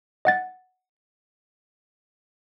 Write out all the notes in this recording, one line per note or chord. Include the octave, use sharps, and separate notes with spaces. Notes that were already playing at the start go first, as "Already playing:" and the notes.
D#5 F#5 A6